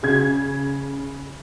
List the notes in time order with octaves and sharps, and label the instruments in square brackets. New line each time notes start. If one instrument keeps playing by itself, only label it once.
[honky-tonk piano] C#3 G#6